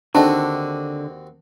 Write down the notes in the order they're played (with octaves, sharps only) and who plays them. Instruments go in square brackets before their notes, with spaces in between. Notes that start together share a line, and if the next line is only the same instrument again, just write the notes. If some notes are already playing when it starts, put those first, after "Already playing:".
[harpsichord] D#2 C4 F#4 [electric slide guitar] D3 [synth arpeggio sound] D4 D#4 A4 [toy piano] A5